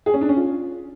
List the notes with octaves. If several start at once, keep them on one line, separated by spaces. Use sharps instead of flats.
G#4
C#4
D4
C#4
F4